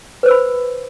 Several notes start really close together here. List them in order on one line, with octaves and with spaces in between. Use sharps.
B4 C5 E6 B5